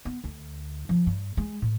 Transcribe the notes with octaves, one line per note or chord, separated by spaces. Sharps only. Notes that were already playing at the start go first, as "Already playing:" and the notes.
B3
D2
F3
G2
G#3
A2